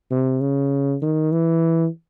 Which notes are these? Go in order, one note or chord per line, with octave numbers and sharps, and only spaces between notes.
C3
C#3
D#3
E3